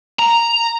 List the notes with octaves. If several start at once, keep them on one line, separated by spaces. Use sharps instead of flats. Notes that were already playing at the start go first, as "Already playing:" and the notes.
A#5